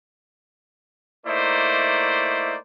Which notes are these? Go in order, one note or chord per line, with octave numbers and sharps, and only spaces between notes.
A3 A#3 D#4 E4 C5 D5